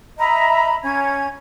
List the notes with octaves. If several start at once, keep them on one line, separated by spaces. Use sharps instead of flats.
D#5 E5 A#5 B5
C#4 G#6